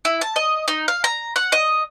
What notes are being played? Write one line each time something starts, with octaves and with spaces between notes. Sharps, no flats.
E4
A5
D#5
D#4
F5
A#5
F#5
D#5